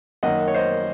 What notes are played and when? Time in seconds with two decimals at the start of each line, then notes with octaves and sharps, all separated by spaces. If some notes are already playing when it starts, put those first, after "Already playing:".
0.23 F#2 D#3 A#3 D#5 F#5
0.48 C#5
0.55 C5 D#5